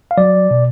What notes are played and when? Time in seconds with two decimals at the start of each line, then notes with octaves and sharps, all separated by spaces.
0.11 F5
0.18 F#3 D5
0.51 B2